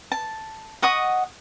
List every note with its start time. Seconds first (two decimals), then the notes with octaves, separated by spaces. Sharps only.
0.12 A5
0.82 D#5 F#5 C#6 D#6